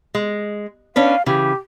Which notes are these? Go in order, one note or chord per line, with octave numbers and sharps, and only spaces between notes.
G#3
C#4 D4 B4 F5
C#3 E3 G4